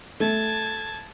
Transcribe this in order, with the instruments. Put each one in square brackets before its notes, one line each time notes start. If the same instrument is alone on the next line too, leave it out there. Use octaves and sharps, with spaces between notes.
[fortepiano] A3 [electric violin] A5 G#6